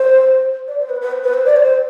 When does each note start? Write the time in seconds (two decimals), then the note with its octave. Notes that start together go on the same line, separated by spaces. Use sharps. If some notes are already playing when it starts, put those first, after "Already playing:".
Already playing: C5
0.68 D5
0.79 C5
0.89 B4
1.01 B4
1.12 C5
1.23 B4
1.33 C5
1.46 D5
1.56 C5